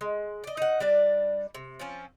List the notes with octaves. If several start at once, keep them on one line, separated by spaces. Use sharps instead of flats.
G#3
D5 D#5
D#4 F#5
G3 D4 D5
C3
F3 C4 C#4